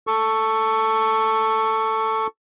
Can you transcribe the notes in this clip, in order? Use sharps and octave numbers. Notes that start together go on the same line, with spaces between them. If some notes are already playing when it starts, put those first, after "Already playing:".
A4 C#6